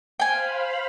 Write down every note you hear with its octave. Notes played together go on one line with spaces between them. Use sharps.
C5 F5 G5 G#5 B5